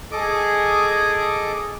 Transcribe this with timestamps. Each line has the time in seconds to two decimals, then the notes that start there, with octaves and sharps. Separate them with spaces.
0.12 G#4 A4 D#5 D6